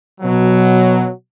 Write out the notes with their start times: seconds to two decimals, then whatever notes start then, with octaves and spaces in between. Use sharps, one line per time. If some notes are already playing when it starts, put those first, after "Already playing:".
0.21 B2 F#3